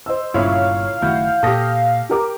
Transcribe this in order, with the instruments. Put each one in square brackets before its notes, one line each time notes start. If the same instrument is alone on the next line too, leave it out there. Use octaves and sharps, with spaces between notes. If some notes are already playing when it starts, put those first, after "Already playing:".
[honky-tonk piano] C5 D#5 E6
[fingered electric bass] G1 G2 [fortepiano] A#2 C#3 E4 [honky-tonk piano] C#5 [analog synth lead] F5
[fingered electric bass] F#1 D#3 A3 [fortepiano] E4 F#4 [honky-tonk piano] G6
[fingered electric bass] A#2 [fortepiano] G4 A4 [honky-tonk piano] D#6 A#6
[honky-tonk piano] G4 A#4 D6